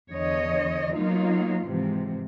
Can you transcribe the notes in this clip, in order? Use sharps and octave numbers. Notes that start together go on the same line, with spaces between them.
E2 D3 C#5 D#5
F#3 A#3 B3 D#4 F4
G#2 C3 E3 F3